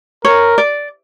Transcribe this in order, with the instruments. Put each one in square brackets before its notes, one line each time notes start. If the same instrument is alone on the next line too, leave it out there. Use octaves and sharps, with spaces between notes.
[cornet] A#4 [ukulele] C#5
[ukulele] D5